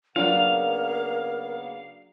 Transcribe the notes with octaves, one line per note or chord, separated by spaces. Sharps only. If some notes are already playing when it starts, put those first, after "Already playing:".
C#3 F#3 A#3 B3 D4 F4 A#4 F5